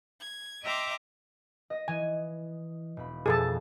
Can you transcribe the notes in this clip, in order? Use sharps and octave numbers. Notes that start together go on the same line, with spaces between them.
G#6
D#5 E5 G5 A#5 C6 D6
D#5
E3 G#5
E1 B5
F2 B2 G#4 A4 A5